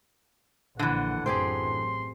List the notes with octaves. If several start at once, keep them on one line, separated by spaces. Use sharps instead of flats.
A#1 A#2 D3 E3 F#5
A1 F#2 C4 G4 G#4 C6